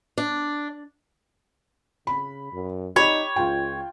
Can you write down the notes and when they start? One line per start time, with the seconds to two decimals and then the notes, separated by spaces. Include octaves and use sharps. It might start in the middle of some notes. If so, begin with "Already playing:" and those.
0.18 D4
2.07 C#3 B5
2.52 F#2
2.96 D#4 G4 C#5 B5
3.36 C#2 F4 G5